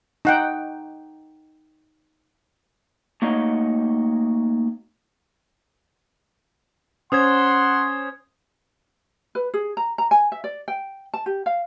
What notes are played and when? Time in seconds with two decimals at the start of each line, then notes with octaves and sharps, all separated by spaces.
0.25 D#4 F#5 G5
3.22 A3 A#3 D#4 F#4 C#5 D#5
7.12 C#4 C5 F#5 C6 D#6 G#6
9.35 B4
9.54 G#4
9.77 A#5
9.98 A#5
10.11 G#5
10.32 E5
10.44 D5
10.68 G5
11.14 A5
11.26 G4
11.46 F5